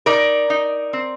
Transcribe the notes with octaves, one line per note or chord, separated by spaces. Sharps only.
D#4 A#4 D5
D#4
C4